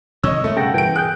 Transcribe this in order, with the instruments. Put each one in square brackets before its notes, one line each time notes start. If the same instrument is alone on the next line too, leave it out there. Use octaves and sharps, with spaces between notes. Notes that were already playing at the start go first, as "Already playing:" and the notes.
[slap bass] C3 D#3 G#3 [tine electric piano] C#5 [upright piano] D#5 C#6 E6
[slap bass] G2 B2 [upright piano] A3
[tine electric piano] C#3 G5 A#6 [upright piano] A4 F#5
[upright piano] E3 D7 [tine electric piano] G5
[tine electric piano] G#4 G5 G6 [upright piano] F#6